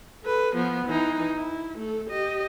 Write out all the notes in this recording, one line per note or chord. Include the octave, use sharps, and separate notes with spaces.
A4 B4
F3 B3
E3 D#4
E4
A3 A4
G4 D#5